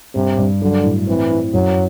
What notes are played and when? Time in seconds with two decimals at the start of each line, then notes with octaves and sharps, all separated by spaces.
0.15 G2 C3
0.37 G2
0.61 D3 F#3
0.84 A2
1.07 E3 C4
1.30 E4
1.53 F#2 F#3